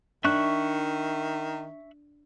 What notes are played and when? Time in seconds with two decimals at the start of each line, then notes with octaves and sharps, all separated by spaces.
0.24 D#3 D4 E5 C#6 F#6